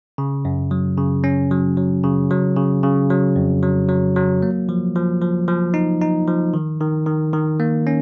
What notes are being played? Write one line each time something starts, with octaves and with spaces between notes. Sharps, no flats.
C#3
F#2
F#3
C#3
C#4
F#3
F#3
C#3
F#3
C#3
C#3
F#3
F2
F#3
F#3
F#3
A#3
F3
F3
F3
F3
D#4
D#4
F3
D#3
D#3
D#3
D#3
A#3
C#4